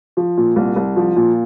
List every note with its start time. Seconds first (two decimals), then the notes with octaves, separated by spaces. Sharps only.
0.17 F3
0.37 A#2
0.56 C2
0.76 C2
0.96 F3
1.16 A#2